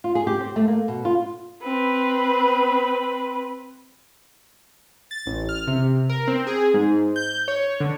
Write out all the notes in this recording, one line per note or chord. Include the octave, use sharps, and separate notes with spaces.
F4
G#4
G4
C4
A3
A#3
B2
F4
C4 B4
A6
A1
F6
C3
A#4
C4
G#4
G#2
G6
C#5
D3